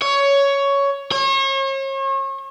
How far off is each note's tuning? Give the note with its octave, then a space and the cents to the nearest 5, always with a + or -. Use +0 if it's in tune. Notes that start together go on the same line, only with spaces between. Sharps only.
C#5 +10
C#5 -40